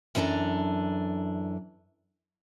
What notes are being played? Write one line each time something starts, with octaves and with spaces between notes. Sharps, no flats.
F#2 E3 G3 D4 A4 A#5